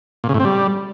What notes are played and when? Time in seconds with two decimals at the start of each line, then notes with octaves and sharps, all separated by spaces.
0.24 A#2
0.29 C#3
0.34 A2
0.40 C4
0.45 G3